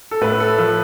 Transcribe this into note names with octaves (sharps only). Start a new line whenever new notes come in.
A4
A2 B4
A4
F3 B4